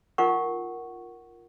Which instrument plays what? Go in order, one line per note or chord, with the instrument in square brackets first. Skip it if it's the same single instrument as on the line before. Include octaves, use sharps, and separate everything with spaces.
[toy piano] D#4 F4 A#4 F#5 C#6